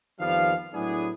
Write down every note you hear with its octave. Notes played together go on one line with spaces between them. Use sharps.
F2 D#3 F3 G3 B3 F5
A2 F#3 B3 D4 E4 G#4